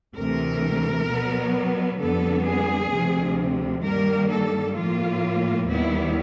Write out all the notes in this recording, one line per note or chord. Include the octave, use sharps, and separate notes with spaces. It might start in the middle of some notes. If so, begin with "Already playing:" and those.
D2 C3 E3 A3 A#4
B2 F#3 B3
F2 D3 G3 B3 A4
G#4
D2 C3 F3
G2 D#3 G3 A#3 A#4
A4
A2 F3 A#3 F4
D#2 D#3 G3 B3 E4